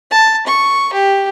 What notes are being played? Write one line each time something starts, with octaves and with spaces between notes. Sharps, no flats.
A5
C#6
G4